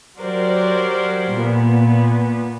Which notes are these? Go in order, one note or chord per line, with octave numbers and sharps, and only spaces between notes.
F#3 F#4 G4 A#4 C5 D5
A#2 B3